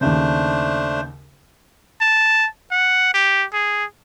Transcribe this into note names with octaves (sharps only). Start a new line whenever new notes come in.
D#2 C#3 A3 D4 C5
A5
F#5
G4
G#4